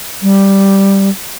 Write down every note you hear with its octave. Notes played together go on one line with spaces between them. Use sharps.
G3